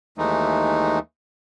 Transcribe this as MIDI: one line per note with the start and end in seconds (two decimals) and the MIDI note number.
0.18 0.99 39
0.18 0.99 52
0.18 0.99 56
0.18 0.99 57
0.18 0.99 63